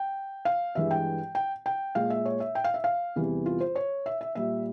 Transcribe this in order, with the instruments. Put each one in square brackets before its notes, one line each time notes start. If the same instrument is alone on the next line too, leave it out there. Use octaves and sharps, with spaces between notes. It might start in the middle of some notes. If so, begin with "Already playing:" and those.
Already playing: [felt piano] G5
F5
G2 E3 G#3 E5
G5
G5
G5
A#2 G#3 F5
E5
C#5
E5
G5
F5
E5
F5
E2 C3 E3 G3
F4
C5
C#5
E5
E5
A#2 G3 E5